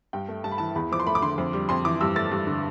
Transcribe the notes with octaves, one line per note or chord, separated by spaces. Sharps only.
G2 G5
A3
G2 A5
B5
E3 A5
E2 B5
F3 D6
C6
A3 B5
D6
D3 C6
F2
G3
F2 C6
E3 D6
G2 E6
A3 A6
G2
D3